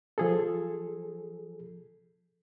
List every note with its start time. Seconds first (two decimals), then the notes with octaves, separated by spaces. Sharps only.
0.18 F3 G#4 A4